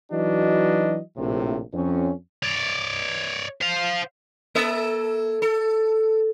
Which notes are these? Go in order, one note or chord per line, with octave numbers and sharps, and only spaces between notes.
E3 F#3 D4 D#4 F#4 D#5
A#1 A2 C3
F2 C#4
C#5 D5
C5 F5
A#3 A4 E5
A4